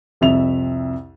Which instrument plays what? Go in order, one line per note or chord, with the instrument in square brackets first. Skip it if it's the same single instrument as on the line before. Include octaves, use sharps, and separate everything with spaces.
[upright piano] C2 F2 E5 F7